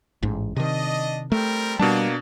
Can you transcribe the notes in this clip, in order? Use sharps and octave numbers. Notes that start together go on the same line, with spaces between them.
A1 G#2
C3 D#3 D4 D#5
G3 A3 C4 A#4
B2 G3 A#3 D4 A5